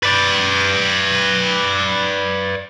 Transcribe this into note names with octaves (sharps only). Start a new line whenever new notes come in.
B4 D5